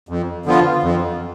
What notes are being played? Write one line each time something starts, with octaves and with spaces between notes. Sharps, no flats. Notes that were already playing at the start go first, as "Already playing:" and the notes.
F2
D3 F3 B3 F4
F2